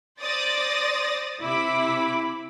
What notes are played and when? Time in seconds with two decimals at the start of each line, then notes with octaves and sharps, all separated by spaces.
0.20 C5 D5 D#6 A6 A#6
1.42 C3 E4 B5 D6